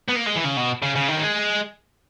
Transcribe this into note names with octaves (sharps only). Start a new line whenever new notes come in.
B3
A#3
G#3
E3
C#3
B2
C#3
C#3
D#3
A#3
G#3